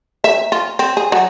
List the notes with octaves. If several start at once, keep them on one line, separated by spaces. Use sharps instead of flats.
E5
F4
C4
G#4
F#3